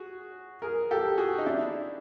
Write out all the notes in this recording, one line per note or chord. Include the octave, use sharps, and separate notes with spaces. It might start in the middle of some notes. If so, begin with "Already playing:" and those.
Already playing: F#4 G#4
G#4 A#4
G4 A4
F#4 G#4
D#4
D4 E4